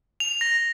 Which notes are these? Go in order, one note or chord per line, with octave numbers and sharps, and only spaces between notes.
F7
A#6